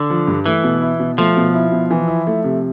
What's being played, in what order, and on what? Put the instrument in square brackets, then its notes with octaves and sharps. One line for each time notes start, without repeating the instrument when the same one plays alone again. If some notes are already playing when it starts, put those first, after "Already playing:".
Already playing: [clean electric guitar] D3
[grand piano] F3
G2
[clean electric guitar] E3 [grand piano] A3
[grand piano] B2
E4
B2
[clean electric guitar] F3 [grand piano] A3
[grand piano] B2
E4
B2
E3
E4
A3
C3